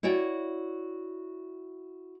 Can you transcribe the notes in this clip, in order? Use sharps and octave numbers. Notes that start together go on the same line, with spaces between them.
E4 F#4 C#5 D5 G5